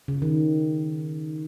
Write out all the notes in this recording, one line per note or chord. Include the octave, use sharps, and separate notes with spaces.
C#3
D#3